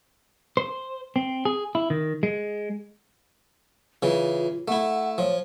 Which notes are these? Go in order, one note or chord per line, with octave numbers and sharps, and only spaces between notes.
C5
C4
G#4
E4
D#3
G#3
C#3 E3 F4
A3 E4 F#5
F3 C#5